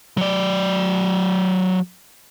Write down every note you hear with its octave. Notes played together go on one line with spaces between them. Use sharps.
F#3 D5